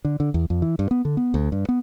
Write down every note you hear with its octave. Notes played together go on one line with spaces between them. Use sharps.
D3
D3
E2
F2
E3
G2
B3
D3
B3
D2
G2
B3